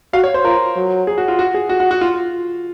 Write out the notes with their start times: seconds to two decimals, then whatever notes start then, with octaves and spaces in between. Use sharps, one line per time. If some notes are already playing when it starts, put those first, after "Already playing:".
0.13 F#4 F5
0.24 C#5
0.34 C5
0.44 F4 A#4
0.76 F#3
1.07 G#4
1.18 F#4
1.28 F4
1.39 F#4
1.54 G#4
1.69 F#4
1.80 F#4
1.91 F#4
2.01 F4